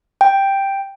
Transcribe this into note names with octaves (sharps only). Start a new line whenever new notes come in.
G5